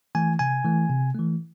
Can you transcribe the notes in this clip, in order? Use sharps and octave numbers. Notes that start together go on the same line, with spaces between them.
E3 A3 G#5
C3 G#5
E3 A3
C3
E3 A3